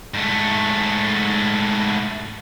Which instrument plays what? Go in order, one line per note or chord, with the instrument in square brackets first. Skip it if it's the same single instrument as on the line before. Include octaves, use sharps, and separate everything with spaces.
[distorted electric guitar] G#2 A3